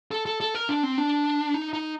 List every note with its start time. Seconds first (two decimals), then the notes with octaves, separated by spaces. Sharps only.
0.11 A4
0.26 A4
0.40 A4
0.55 A#4
0.69 D4
0.83 C4
0.98 D4
1.54 D#4
1.73 D#4